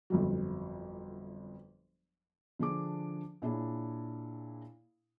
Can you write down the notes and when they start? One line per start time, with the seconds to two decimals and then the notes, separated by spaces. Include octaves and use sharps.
0.10 G1 F2 F#3
2.59 D3 F3 D4 G#4 D6
3.42 A#2 D4 E4 G#4 C#5